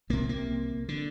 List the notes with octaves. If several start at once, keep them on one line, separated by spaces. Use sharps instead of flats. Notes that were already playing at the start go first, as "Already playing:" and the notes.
C2 C3 A#3
A#3
D3